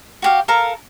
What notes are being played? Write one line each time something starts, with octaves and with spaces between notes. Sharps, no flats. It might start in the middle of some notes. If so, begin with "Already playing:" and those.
F#4 G4 F5
A4 A#4 F5 A#5